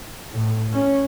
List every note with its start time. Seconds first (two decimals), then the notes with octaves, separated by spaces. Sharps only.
0.30 A2
0.73 C#4